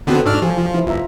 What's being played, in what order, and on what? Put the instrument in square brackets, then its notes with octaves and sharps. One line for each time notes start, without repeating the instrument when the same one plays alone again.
[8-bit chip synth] D3 B3 C4 [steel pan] D4 F#4 A4
[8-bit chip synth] G#2 D4 F6 [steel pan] D5 C#6 E6
[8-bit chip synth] F3 [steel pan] G4 G#5 A5
[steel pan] F4
E4 C5
[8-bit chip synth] G1 [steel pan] F4 E5 A#5